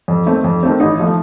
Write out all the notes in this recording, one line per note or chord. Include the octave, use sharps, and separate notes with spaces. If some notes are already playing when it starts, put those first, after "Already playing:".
F2
D#3 A3 C4
F2
D#3 A3 C4
A1 D#4
F3 A3